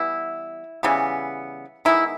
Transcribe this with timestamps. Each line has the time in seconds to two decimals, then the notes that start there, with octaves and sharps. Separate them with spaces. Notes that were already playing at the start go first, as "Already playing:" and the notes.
Already playing: E3 G3 B3 E4
0.83 C#3 E3 G3 B3
1.85 D#3 G#3 B3 E4